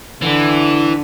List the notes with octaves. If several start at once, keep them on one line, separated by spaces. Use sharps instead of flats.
D3 E3